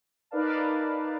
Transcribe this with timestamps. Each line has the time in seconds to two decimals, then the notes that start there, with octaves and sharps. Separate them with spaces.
0.31 D#4 A#4 B4 D5 F5 A5